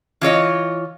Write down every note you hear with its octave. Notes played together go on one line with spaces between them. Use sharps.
E3 F4 C#5 D#5